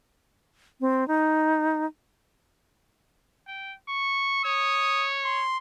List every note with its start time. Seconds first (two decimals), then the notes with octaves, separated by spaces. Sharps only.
0.81 C4
1.08 D#4
3.47 G5
3.88 C#6
4.45 C#5 D#6
5.25 C6